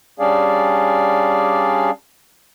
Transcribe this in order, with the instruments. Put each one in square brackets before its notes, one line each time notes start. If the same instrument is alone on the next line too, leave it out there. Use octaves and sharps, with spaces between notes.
[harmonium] G3 C#4 D4 G#4 D5 F5